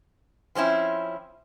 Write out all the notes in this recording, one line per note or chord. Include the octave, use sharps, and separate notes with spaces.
F3 C4 C#4 E4